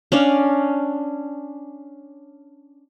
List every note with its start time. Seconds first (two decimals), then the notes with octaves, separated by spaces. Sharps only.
0.12 C#4 D4 D5 F5